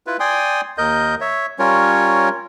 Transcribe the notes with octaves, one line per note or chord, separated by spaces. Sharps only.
E4 F4 B4
D5 G5 G#5 C6 D#6
D#2 A#4 D#5 G6
C#5 E5
G3 C#4 F4 A#4 C#5